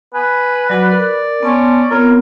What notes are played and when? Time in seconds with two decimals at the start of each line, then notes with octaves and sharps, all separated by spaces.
0.14 B4 G#5
0.69 F#3 F#4 D5 B5
0.92 A#4
1.43 B3 C#4 A5 C6
1.91 B3 C4 F4 A#4 C#5